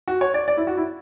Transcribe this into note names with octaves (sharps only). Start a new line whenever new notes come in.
F#4
C#5
D5
D5
E4
F#4
E4